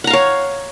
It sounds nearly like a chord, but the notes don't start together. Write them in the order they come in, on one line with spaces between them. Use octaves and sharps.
F#5 A#5 F5 C#5